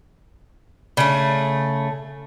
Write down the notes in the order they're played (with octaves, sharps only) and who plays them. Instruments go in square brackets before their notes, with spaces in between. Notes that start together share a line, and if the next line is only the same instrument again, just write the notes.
[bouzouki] C#3 A3